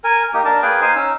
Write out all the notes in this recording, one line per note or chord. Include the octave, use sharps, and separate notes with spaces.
A#4 G#5
A#3 D#4 G4
D4 A#4 A5
A#3 G#4 B4 G5
D#4 C5 F5 G#5
C#4 D#4 E6